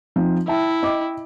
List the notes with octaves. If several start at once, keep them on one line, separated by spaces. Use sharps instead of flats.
F3 C4 D#4
E4 E5 G5 A5
D#5 G5 D6